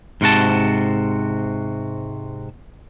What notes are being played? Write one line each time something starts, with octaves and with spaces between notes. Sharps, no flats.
G#2 C3 F#4 A5